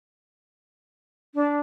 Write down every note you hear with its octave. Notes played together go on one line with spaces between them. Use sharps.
D4